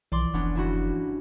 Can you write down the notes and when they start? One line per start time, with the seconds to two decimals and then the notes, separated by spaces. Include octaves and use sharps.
0.12 B1 E3 F3 D5 C6 D6
0.34 F1 B3 C#4 D4
0.55 G1 E4 F#4